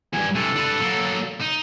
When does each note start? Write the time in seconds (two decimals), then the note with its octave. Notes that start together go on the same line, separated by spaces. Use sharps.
0.13 E2 G2 G#5
0.35 C3 E3 A4
0.56 D4 B4
0.80 F#3 A#3
1.41 D#4